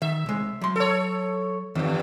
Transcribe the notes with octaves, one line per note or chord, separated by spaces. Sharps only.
D#3 E5
C2 G#3
F#3 C6
A4 C#5
E2 G2 D#3